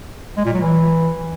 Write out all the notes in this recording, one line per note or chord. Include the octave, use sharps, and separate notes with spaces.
G#3
A#2
F#3
E3